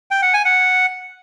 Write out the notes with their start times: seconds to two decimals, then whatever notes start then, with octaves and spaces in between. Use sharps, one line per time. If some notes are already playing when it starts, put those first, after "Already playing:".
0.11 G5
0.22 F#5
0.34 G#5
0.45 F#5